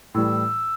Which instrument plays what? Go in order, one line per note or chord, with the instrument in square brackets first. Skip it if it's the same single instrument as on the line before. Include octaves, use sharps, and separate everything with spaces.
[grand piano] A2 E3 G3 [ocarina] E6